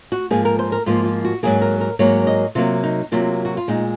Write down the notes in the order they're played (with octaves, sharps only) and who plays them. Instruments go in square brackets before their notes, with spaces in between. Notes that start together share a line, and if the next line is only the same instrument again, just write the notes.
[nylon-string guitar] F#4
G#2 F3 A#3 G#4
A#4
C5
A#4
G#2 F3 A#3 F4
F4
F#4
G#2 F#3 A#3 G#4
A#4
A#4
G#2 F#3 A#3 C#5
D#5
C3 F#3 A#3 F4
D#4
C3 F#3 A#3 F4
F#4
F4
A#2 G#3 D#4